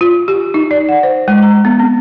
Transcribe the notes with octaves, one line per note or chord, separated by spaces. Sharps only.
F4
G4
D#4
D5
F#5
C5
G#3
A#5
B3
C4